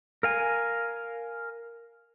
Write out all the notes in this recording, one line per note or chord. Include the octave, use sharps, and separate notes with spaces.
A#4 F5 G#5